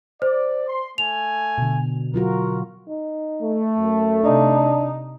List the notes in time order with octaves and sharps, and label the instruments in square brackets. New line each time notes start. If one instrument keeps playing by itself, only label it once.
[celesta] C5 [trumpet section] D5
[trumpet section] C6
[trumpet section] A3 G#5 [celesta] F7
[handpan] B2 D3
[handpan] F#3 F4 F#4 [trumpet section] A#4
[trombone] D#4
[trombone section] A3
[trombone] F#2
[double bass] C3 D#4 [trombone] D4